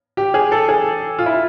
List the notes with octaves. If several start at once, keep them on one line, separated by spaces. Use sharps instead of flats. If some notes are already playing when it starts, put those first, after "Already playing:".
G4
G#4
A4
G#4
F4
E4